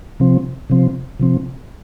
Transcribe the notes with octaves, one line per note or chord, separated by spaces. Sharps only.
C3 F3 C4
C3 F3 C4
C3 F3 C4